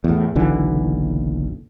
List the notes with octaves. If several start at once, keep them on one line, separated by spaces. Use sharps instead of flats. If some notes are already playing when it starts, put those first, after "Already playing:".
E2 A2
F#1 B1 D3 E3